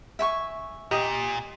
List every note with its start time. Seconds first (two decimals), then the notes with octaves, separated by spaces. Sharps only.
0.19 E5 G#5 C#6
0.91 A#2 G4 D#5